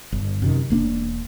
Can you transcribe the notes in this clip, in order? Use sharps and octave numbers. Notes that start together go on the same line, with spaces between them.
G1
F#2 C3 D#3
E1 A#3 B3 D4